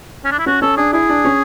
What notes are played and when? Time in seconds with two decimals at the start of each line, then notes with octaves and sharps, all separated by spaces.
0.25 C#4
0.32 D4
0.39 E4
0.46 C#4 F#4
0.62 C#4 A4
0.77 D4 G#4
0.93 E4 G#4
1.09 D4
1.25 C#4